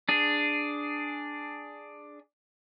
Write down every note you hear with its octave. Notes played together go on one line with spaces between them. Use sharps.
D4 G#4